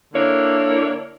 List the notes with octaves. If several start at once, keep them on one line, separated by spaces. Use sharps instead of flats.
D3 A#3 D4 E4 C#5